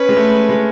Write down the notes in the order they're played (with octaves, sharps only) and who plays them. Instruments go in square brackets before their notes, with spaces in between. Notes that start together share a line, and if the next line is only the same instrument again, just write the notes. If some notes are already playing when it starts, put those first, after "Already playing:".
Already playing: [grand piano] C#4 [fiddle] B4
[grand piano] G#3
A3
G#3